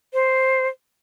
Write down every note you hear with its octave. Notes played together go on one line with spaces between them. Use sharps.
C5